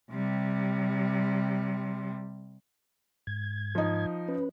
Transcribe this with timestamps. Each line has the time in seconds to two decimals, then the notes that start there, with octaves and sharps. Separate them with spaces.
0.11 C3 G3
3.27 G#2 G#6
3.75 F3 D#4
4.28 C#4 B4